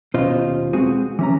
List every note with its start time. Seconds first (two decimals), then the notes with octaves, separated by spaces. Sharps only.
0.14 D#2 B2 C#4 F4 C5 D#5
0.73 G#3 C4 F#4 G#4
1.19 E3 C#4 A#5